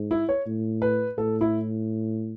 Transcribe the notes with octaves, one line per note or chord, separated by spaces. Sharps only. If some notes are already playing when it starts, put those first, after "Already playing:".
Already playing: G#2
E4
C#5
A2
B4
A2 A4
E4